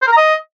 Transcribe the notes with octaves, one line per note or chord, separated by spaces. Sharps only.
C5
A#4
A#5
D#5